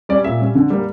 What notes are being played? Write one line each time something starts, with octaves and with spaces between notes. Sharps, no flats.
G3 C#4 D5
A#2 E5
G3 C#4
D3
G3 A#3